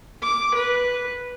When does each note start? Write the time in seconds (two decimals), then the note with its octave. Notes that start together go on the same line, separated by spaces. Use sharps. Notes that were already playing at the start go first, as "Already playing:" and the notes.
0.23 D6
0.55 B4